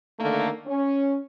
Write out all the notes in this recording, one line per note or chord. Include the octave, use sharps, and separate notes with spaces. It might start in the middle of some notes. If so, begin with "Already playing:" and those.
D3 D#3 A3 A#3
C#4